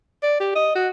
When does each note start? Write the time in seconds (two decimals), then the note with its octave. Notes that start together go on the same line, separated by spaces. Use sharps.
0.23 D5
0.40 G4
0.55 D#5
0.75 F#4